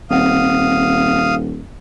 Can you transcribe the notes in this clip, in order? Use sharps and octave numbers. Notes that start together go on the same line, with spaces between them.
D#1 C4 F5 F#5 D#6